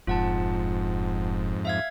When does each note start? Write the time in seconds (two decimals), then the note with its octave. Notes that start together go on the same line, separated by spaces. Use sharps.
0.07 E1 F2 G#2 F4 F#5 A5
1.65 E5 F5 G#6